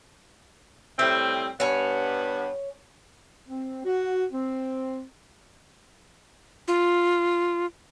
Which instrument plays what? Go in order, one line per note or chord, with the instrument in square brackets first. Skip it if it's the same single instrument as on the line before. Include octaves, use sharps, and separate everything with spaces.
[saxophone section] A2 G3 C4 [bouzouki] E5
[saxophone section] G2 G3 B3 [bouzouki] C#5 G#5
[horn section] C4
F#4
C4
[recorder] F4